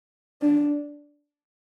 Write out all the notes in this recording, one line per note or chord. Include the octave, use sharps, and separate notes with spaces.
D4